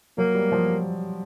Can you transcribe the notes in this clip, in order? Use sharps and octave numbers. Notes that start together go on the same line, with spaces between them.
F#3 A#3
G3
F3